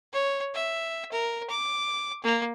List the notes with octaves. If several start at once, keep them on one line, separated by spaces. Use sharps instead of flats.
C#5
E5
A#4
D6
A#3